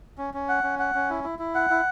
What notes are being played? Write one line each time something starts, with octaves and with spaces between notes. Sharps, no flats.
C#4
C#4
F#5
C#4
F#5
C#4
E4
E4
E4
F#5
E4